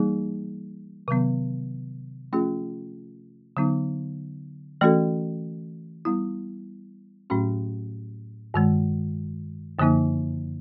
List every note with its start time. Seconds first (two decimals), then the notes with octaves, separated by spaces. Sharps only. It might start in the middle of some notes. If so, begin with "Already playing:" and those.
Already playing: E3 G3 A#3 D#4 G#4
1.08 C3 D#3 F#3 B3
2.33 F3 A3 C#4 F4 G#4
3.57 D3 F#3 B3 D#4
4.81 E3 A3 C#4 F#4 A4
6.05 G3 B3 E4
7.30 A2 F#3 A3 C#4 F#4
8.54 G2 D#3 G#3
9.79 F#2 D3 F3 A#3 D#4